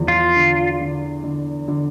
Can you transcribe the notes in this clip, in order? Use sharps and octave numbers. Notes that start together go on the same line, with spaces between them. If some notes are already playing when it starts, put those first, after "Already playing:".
Already playing: E2 F3
F4
D3
D3
D3
D3